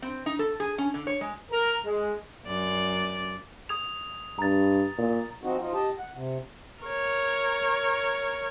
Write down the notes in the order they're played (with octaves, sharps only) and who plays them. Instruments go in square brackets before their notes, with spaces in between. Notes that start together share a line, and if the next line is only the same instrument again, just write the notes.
[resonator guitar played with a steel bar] C4
D#4
A4
G#4
C#4
D3
C#5
G#3
[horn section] A#4
G#3
[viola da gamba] F#2 D5
[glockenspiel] D#6 G#6 F7
[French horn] G2 [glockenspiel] A#5 A6
[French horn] A#2
[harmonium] F3 C4 D#4 F#4
F3 D#4 F4
G4 D#5 A5
F#5
C3
[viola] A#4 C#5